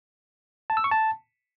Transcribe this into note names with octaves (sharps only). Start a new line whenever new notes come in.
A5
E6
C#6
A5